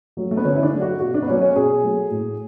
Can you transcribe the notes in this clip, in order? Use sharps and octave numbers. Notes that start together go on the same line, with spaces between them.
F#3 A3
A3
B3
D3 C#4
E4
D4
F#3 A3
F#4
B2 F#4
D4
B3
F#3 A3 C#4
C#4
B2 G#4
F#3 A3
A2